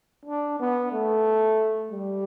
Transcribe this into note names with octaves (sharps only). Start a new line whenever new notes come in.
D4
B3
A3
G3